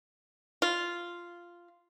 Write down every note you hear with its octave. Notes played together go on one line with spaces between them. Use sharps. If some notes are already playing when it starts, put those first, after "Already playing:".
F4